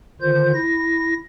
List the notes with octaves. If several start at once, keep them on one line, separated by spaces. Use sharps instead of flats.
D3 D#3 F4 C5 G6
E4 A#6